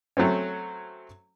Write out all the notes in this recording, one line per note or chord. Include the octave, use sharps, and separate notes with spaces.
F#3 A3 C4 C#4